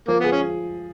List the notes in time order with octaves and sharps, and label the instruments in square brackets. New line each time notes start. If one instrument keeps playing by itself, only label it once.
[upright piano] F3 [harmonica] A#3
[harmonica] B3 [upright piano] G#4
[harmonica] C#4